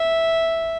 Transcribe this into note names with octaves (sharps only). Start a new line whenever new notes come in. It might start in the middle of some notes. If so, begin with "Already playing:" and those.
Already playing: E5